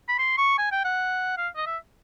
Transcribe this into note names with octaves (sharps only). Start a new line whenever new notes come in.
B5
C6
C#6
G#5
G5
F#5
F5
D#5
E5